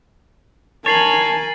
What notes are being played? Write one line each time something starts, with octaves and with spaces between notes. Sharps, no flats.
A#4 C#5 G#5 A5 A6 C7 F#7